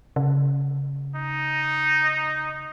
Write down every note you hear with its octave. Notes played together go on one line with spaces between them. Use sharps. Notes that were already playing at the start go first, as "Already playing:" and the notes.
C#3
D#4